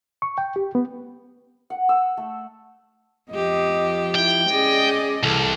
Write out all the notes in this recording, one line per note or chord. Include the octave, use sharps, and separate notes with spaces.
C#6
G5
G4
B3
F#5
E6
A3
F2 F3 G4 D#5
E4 G5
C#4 G#4 D5 D#5
C2 E3 A4